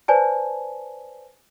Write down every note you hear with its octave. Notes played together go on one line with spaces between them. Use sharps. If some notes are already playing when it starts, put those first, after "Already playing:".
B4 C5 D5 G#5 A5